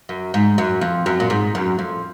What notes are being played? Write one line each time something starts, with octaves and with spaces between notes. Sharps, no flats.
F#2
G#2
F#2
F2
F#2
A#2
G#2
F#2
F2